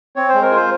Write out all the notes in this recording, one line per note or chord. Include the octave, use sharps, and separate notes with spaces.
C4 C#5
C5
G#3
A#4
F4 C5